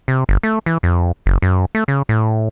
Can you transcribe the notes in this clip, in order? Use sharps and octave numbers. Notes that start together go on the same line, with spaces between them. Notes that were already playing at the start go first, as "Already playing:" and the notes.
C3
G1
A3
E3
F2
F#1
F#2
A3
C#3
A2